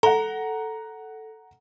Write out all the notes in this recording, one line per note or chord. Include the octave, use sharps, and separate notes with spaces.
A4 F#5 A#5